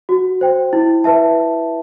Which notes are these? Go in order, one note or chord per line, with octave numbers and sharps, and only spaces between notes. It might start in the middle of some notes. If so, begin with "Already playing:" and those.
F#4
C5 G5
E4
B4 E5 A5